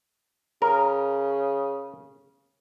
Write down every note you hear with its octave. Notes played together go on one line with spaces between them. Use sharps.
C#3 A#4